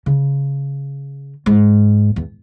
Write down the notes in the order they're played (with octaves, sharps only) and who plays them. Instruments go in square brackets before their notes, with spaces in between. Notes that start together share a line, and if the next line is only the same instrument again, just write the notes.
[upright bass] C#3
G#2
E2